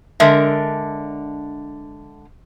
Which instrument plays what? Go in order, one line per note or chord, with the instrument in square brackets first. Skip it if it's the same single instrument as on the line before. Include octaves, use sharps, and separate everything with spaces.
[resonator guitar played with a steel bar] D3 G#3 D4 A#4 E5